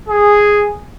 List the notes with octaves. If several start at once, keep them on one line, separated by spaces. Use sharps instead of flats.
G#4